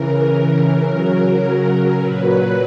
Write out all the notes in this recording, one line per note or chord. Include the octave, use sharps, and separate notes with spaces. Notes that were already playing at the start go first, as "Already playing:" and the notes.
Already playing: C#3 E3 A#4
C#3 F#3
A#2 F#3 B4